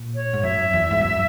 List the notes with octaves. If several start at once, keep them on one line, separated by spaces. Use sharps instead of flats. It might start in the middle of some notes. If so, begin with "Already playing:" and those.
Already playing: A#2
C#5
G#2
F#2 E5
E2
G#2
F#2